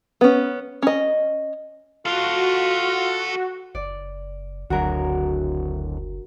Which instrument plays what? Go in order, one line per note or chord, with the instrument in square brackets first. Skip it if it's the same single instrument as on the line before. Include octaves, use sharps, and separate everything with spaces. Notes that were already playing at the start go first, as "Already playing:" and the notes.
[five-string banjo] B3 C#4
C#4 D#5
[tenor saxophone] F4 [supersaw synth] F#4 [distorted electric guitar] A4 F5
[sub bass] F#1 [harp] D5
[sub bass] F#1 [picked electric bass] D2 F#3 [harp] F#4 A#4